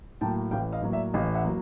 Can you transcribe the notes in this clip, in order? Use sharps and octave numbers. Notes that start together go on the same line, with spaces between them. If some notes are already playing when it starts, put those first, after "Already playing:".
A2 F#3 A#3 G5 A5
A1 F5 G5
D#5 F5
A2 F#3 A#3
D5 E5
A1 D#5 F5
E5 F#5
F#3 A#3